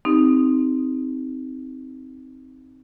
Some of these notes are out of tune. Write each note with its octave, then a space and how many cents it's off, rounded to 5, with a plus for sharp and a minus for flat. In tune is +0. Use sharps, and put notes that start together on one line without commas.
C4 +0 D#4 +0 G4 +0